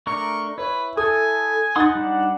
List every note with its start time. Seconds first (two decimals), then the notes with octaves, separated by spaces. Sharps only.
0.07 A3 D4 A#4 C#6
0.58 E4 B4 C#5
0.97 A4 G#5 D#6
1.76 D#4 F#5 C6 D#6 A6
1.95 G3 D4